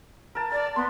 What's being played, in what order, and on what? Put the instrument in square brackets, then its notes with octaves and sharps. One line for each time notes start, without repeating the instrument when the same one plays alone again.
[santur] A#4 A5
[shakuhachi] D5 [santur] A5
[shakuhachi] B3 [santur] C6